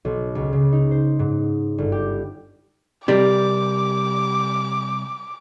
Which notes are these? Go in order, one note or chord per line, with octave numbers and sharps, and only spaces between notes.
B1
C#2
C#3
D#4
C5
G#2
G1
G4
C3 G3 G4 A#4 D5 D6